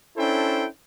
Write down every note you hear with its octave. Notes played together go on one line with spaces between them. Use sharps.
C#4 D4 E4 A4 C5 G5